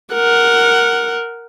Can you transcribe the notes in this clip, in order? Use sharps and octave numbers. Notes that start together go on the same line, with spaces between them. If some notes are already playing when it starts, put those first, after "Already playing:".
A#4 F#5